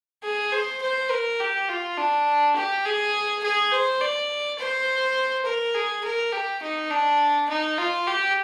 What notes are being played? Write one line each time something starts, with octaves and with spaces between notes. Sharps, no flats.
G#4
C5
C5
A#4
G4
F4
D4
G4
G#4
G#4
C5
D5
C5
A#4
G#4
A#4
G4
D#4
D4
D#4
F4
G4